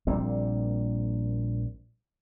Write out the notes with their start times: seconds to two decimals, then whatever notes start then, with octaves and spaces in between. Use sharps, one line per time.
0.07 A#1 A#2 G3 C4